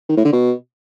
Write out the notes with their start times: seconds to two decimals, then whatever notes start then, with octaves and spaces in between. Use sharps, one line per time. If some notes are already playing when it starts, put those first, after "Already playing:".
0.09 D#3
0.17 A2
0.25 D3
0.33 B2